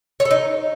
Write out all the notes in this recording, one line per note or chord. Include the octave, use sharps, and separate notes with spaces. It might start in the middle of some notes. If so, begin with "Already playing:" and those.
C#5
A4
D#4